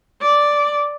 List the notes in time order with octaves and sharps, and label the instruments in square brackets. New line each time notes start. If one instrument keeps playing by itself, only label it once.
[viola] D5